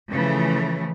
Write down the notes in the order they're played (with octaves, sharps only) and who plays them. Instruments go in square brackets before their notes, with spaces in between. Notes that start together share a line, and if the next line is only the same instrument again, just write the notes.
[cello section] C#3 E3 F3 A3